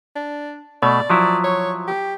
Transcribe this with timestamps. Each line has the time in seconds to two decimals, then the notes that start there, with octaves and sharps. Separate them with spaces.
0.16 D4
0.83 B2 A3 D5
1.10 F3 F#3 E4
1.44 C#5
1.87 G4